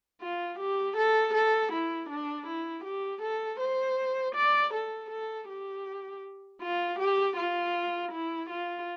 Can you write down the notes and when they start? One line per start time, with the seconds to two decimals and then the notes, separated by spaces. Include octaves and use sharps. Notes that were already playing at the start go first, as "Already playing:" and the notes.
0.21 F4
0.59 G4
0.97 A4
1.34 A4
1.72 E4
2.10 D4
2.47 E4
2.84 G4
3.22 A4
3.60 C5
4.36 D5
4.74 A4
5.11 A4
5.49 G4
6.62 F4
6.99 G4
7.37 F4
8.12 E4
8.50 F4